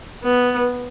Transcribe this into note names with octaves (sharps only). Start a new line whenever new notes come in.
B3